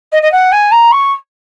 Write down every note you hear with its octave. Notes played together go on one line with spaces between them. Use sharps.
D#5
D#5
F#5
G#5
A#5
C#6